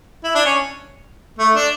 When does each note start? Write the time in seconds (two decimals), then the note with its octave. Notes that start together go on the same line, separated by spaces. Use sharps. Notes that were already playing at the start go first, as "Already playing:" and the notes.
0.24 E4
0.35 D4
0.45 C#4
1.38 A3
1.55 D4